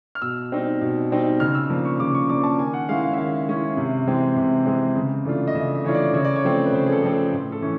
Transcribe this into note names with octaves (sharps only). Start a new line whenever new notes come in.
F6
B2 E6
G3 C4 D#4
B2
G3 C4 D#4
C#3 F6
E6
F3 A#3 D4
C#6
C#3 D6
C#6
F3 A#3 D4 D6
A5
D#3 G#5
F#5
G#3 C#4 E4 F5
F5
E5
D#3 F5
G#3 C#4 E4
C3
E3 G#3 C4
C3
E3 G#3 C4
C#3
E3 A3 D4 F4
D#5
C#3 E5
E5
E3 A3 D4 F4 C#5
D5
C#3 C#5
D5
C#5
F3 A3 C4
B4
C#3 C5
G#4
A4
F3 A3 C4
A4
A2
A4
E3 A3 C#4